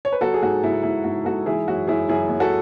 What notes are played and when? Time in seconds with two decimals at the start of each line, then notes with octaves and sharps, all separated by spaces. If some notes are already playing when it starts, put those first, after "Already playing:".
0.05 C#5
0.12 B4
0.21 F#3 F#4 A4
0.34 G#4
0.42 G#2 F#4
0.63 G#2 E4
0.83 G#2 E4
1.04 G#2 F#4
1.25 G#2 F#4 A4
1.46 E3 E4 G#4
1.68 F#2 F#4
1.88 F#2 E4 G#4
2.09 F#2 E4 G#4
2.29 F#2
2.40 F#4 A4